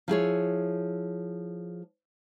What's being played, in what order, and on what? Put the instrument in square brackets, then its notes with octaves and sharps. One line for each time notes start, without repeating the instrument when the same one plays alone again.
[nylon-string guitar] F3 E4 G#4 C#5